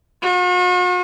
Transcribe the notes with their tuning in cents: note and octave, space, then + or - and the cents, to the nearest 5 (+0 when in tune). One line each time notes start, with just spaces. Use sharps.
F#4 -45